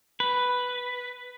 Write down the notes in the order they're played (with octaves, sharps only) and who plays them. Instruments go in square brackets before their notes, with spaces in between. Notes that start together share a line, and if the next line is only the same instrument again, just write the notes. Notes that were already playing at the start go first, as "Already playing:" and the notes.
[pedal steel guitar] B4